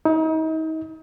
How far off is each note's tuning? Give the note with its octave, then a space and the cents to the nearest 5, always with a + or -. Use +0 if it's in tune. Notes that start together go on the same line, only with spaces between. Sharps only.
D#4 +35